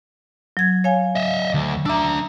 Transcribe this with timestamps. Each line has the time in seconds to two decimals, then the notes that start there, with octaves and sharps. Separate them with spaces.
0.57 F#3 G#6
0.84 C#5 F5 G#5
1.15 D#5 E5
1.54 D2
1.86 D4 E5 A#5 D6 E6